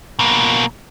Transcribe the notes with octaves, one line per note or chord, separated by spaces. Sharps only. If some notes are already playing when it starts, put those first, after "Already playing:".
B2 A#3